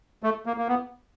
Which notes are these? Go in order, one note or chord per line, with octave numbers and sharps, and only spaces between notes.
A3
A#3
A#3
B3